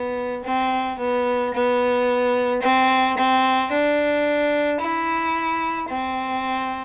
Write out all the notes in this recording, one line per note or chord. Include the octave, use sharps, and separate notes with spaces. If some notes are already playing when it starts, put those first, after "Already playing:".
Already playing: B3
C4
B3
B3
C4
C4
D4
E4
C4